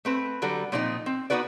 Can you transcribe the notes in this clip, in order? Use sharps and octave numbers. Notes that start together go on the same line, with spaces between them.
A3 C4 B4
D3 F#3 G3 A4
A#2 F3 C4 D4 D#4 D#5
C4
B3 D#4 F#4 B4 D5